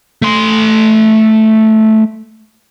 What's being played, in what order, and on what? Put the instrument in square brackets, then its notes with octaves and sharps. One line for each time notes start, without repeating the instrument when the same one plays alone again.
[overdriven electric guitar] A3 C6